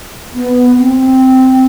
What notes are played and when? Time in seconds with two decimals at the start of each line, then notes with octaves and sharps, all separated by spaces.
0.33 B3
0.77 C4